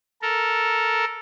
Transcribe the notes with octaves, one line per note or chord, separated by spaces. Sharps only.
A4 A#4